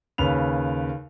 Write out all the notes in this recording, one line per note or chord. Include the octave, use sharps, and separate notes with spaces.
D#2 C#3 B4 F7